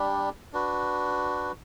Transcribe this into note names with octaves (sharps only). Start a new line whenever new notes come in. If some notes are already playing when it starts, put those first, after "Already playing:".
Already playing: G3 D4 G4
D4 F#4 B4